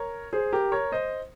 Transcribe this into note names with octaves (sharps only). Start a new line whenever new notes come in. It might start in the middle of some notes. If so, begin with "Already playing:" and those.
Already playing: A#4 C#5
G#4 C5
G4 A#4
A#4 C#5
C5 D#5